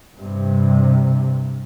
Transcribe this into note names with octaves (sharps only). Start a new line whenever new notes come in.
G2 C3